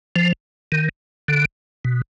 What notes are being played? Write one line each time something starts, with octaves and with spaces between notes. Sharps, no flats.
F3
D#3
D3
B2